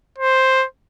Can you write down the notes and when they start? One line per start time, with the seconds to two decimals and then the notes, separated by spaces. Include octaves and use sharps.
0.18 C5